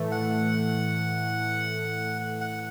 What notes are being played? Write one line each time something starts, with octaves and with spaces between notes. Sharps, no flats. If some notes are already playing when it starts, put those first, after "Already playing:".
Already playing: A2 E3 A3
F#5
F#5